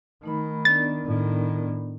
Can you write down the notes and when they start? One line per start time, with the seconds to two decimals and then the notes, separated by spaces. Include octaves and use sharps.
0.23 D#3 A3 D#4 B5
0.65 B3 D4 D5 A6
1.05 A2 D#3